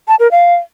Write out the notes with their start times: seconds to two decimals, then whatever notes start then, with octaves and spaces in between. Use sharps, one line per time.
0.08 A5
0.20 A#4
0.31 F5